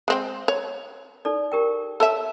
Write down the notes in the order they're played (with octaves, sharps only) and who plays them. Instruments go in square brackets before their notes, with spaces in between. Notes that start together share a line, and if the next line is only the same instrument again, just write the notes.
[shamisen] G#3 C4 G5
C#5
[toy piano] D#4 A4 D5
G4 A#4 G5
[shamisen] A4 C#5 E5 [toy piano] A5